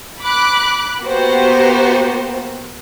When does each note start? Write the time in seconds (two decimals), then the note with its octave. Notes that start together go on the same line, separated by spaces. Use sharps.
0.21 B5 D6 F#6
1.01 A#3 B3 F#4 G4 C5